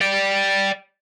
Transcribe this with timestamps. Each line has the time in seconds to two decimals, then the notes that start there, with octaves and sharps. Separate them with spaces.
0.01 D5 G5